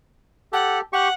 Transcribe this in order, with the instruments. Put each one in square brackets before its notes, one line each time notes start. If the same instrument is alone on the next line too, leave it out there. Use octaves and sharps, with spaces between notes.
[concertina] G4 A4 [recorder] F#5
[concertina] G4 C#6 [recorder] F#5